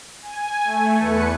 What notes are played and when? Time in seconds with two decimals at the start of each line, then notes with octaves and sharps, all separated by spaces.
0.22 G#5
0.64 A3
0.98 E2 B4 C#7